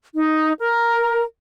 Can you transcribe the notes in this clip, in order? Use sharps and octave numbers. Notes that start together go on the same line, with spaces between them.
D#4
A#4